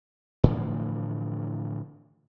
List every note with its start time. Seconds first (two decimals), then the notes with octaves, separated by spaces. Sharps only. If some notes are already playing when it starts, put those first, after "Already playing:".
0.44 A2 D3 E3 F3